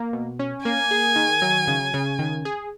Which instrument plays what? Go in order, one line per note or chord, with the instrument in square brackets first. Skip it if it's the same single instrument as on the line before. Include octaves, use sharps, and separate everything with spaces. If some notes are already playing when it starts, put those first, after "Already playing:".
Already playing: [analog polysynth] A#3
B2
C#4
[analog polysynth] A#3 [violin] G#5
[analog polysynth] G#4
D#3
F#3
C#3
C#3
D#3
G#4